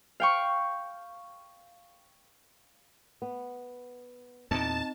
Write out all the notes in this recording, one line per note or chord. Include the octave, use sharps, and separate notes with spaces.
F5 G5 C#6
B3
E2 A#2 C4 D#4 A5